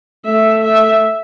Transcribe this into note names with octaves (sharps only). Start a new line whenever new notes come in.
A3 E5
E5